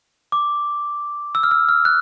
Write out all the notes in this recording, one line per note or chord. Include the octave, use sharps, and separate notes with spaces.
D6
E6
F6
E6
F6
F#6